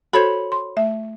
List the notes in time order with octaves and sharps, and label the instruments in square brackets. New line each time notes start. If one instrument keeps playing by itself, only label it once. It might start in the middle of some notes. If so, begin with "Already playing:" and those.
[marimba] F#4 A4 [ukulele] C5 C#5 B5
[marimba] C6
A3 E5